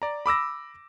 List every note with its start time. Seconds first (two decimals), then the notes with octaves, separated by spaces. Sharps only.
0.02 D5 A#5
0.26 B5 D6 E6 A#6